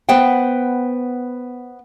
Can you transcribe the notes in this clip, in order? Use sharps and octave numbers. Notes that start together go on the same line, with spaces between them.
B3 C5 F#5 G5